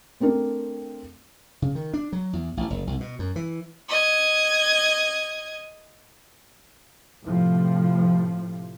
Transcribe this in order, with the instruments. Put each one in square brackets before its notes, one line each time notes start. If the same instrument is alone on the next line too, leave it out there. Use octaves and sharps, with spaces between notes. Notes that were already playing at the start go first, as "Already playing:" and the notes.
[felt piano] A3 C4 D4 A#4
[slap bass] C#3
D#3
D4
F#3
E2
A1
F#1
C2
B2
F#2
E3
[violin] D#5 G#6
[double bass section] A2 C3 F3